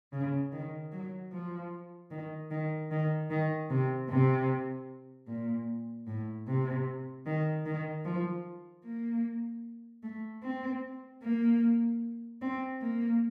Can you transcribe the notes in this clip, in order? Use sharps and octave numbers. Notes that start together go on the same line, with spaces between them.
C#3
D#3
F#3
F3
D#3
D#3
D#3
D#3
C3
C3
A#2
A2
C3
D#3
D#3
F3
A#3
A3
C4
A#3
C4
A#3